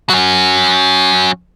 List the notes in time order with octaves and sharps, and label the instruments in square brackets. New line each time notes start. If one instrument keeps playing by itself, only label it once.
[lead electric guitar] F#3 C#4